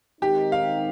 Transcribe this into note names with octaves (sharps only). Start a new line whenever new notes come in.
D#3 G#3 C4 D#4 G4
F5